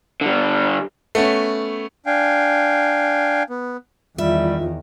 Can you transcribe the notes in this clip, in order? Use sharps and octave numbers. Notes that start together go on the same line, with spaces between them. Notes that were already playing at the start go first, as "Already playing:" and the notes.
D3 G3
A3 B3 C#4
D4 F5 G5 G#5
B3
E2 D#3 G3 F4 E5